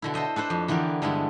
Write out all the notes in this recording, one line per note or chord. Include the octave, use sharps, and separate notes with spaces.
B2 D3 E4
A4 C5 D#5 E5
D4 A4 B4 C5
F2
D3 E3 B3 G4 A#4
G2 D3 G#3 B3 E4